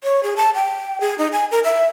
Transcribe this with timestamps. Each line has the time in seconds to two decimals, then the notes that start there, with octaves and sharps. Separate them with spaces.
0.04 C#5
0.23 G#4
0.37 A5
0.55 G5
1.01 G#4
1.18 D#4
1.32 G#5
1.51 A#4
1.64 E5